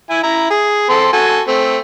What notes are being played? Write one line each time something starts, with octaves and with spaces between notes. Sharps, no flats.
E4 G#5
E4 A#5
G#4
C4 A4 C6
F#4 A4 G#5
A3 C4